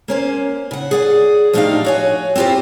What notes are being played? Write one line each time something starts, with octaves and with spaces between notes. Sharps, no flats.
A#3 C#4 C5
C#3 F#5
G#4 D5 F#5
F3 A3 D4 D#4 G4 F5
F#4 C#5 G#5
C4 E4 F4 G4 C5